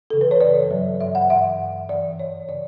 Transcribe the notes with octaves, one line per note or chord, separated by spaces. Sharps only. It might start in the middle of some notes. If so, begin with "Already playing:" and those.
F#2 C#3 E3 A4
B4
C#5
F#2 C#3 E3 D5
G2 F#3
G2 F#3 E5
F#5
G2 E3 E5
G2 E3
F#2 E3 D5
F#2 E3 C#5
C#3 E3 D5